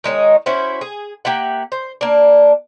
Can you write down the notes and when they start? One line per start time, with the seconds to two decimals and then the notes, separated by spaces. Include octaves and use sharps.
0.04 D#3 G#3 D#4 C#5
0.46 C#4 E4 F#4 C5
0.81 G#4
1.25 A#3 G4 E5 F#5
1.72 C5
2.01 A#3 D4